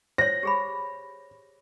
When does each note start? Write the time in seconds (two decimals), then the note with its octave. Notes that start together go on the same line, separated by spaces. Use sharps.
0.18 C5 C#5 A#6
0.43 G4 G#4 B5